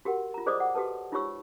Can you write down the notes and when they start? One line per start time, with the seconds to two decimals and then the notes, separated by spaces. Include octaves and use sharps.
0.05 F#4 G4 A#4 F#5
0.34 F4 A#5
0.46 G#4 C5 D5 D#5 D6 D#6
0.60 F#5
0.75 F#4 G4 A4 B4 A5
1.12 D#4 F4 G4 C#5 C#6 E6